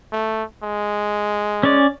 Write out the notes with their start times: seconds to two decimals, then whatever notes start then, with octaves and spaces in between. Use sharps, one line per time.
0.12 A3
0.63 G#3
1.63 C#4 D5